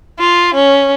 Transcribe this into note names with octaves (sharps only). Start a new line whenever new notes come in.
F4
C#4